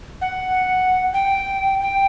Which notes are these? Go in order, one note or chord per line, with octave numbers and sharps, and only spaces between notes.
F#5
G5
G5